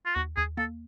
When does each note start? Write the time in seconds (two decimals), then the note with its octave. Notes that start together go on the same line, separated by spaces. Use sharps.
0.06 F4
0.15 D#2 F#4
0.37 D#2 G#4
0.57 A#3 A4